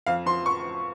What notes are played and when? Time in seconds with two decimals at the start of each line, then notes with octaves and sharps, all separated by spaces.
0.06 F2 F5
0.26 F3 C6
0.46 C#6